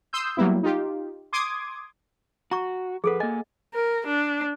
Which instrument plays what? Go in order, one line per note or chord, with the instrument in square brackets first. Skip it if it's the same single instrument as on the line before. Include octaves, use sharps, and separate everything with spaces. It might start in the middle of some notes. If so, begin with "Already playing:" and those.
[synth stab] C6 D#6 E6 G6
F#3 G3 A#3 B3 E4
D#4 F4 G4
C6 D6 D#6 G#6
[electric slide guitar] F#4 [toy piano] A#5 C#6
[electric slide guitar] F2 B4 [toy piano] G#4 A4 F#5
[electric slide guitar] A#3 G#5 [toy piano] D#5
[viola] A#4
D4